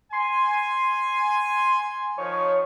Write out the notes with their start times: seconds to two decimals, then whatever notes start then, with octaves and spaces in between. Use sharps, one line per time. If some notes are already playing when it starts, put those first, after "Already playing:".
0.13 G#5 C6
2.18 D#3 F3 C#5